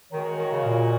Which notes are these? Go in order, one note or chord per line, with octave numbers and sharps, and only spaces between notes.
D#3 G#3 F#4 A#4 C#5
D#3
C#3
A#2